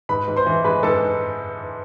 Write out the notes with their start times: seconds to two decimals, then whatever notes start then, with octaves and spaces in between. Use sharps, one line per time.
0.09 G#2 B4 B5
0.28 G#2
0.36 C5 C6
0.46 E3
0.64 G#3 B4 B5
0.83 G#2 A4 A5